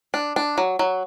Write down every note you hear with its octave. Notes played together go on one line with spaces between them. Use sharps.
D4
D4
F#3
F#3